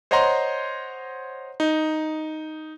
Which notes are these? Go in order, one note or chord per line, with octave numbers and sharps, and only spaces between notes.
C5 C#5 D#5 F#5 A#5 C6
D#4